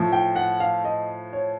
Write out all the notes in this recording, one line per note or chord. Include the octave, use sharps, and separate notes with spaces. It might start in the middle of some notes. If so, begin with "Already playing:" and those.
Already playing: A2 F3
G5
F#5
F5
D#5
C#5